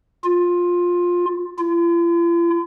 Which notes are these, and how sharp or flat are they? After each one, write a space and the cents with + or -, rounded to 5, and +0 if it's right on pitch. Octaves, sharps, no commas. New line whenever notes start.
F4 +15
F4 -45